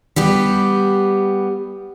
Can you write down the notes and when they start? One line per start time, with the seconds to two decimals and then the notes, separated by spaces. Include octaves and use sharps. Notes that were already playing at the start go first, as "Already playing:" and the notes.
0.16 G3 B3 G4